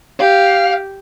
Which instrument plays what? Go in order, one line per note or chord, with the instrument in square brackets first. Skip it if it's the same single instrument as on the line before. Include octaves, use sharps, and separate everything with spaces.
[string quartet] G4 [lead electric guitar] F5